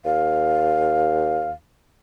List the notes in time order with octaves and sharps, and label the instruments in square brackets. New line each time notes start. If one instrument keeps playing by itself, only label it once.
[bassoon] D#2 [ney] F5